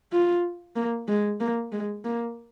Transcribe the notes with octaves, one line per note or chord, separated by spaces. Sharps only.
F4
A#3
G#3
A#3
G#3
A#3